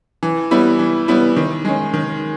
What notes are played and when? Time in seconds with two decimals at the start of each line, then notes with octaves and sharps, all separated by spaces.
0.23 E3
0.51 G3 B3 E4
0.79 E3
1.08 G3 B3 E4
1.36 D#3
1.65 G#3 C#4
1.94 D#3